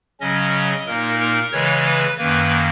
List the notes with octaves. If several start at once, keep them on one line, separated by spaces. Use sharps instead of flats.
C#3 F#3 C#4 D#5
A#2 A#3 D#4 A#4
A#4
C#3 E3 G#3 C#5
B4
F#2 D#3 A#3 B4